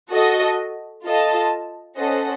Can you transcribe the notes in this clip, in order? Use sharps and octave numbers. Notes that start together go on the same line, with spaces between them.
F#4 A4 D#5
F4 A4 D#5 A5
C#4 A4 C5 D#5 F#5